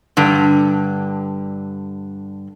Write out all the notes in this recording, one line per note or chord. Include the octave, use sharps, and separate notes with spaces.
G2 D3